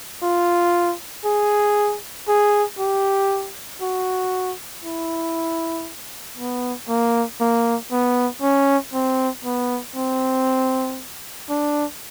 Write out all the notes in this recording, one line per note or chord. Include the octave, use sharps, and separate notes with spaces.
F4
G#4
G#4
G4
F#4
E4
B3
A#3
A#3
B3
C#4
C4
B3
C4
D4